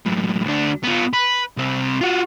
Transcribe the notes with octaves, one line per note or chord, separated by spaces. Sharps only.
F#2 A2
D2 D4
B3 F4
B4
C2 C4
F4 F#4